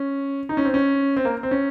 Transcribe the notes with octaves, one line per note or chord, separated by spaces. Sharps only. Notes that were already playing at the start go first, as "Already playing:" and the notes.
Already playing: C#4
D#4
C#4
C4
C#4
C4
A#3
C4
C#4